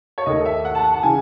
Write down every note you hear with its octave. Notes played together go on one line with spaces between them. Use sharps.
C#5
D#2 D#3 A3 D#5
E5
F#5
A5
F#5
A5
C#3 E3 G#5